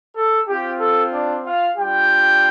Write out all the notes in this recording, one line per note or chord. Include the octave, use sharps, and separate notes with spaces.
A4
C4 F4 G4
A4
D4 D5
F4 F5
G3 D4 F4 G4 G5